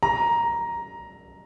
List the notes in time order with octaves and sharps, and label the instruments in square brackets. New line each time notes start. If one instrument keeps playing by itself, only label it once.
[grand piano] A#5